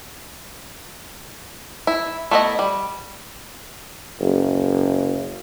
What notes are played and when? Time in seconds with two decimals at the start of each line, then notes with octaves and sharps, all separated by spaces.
1.87 E4
2.31 A3 B3 E4 F#4 D#5
2.59 G3
4.21 F#1